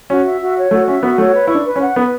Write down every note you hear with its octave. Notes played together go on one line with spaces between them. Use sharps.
C#4 F#4
E5
F#4
C#5
A3 F#4
C#4 E5
B3 F#4
A3 C#5
B4
E4 C#6
D4
B4
C#4
F#5
B3 B4